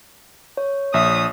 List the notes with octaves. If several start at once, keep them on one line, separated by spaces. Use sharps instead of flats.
C#5
A#1 E5 D#6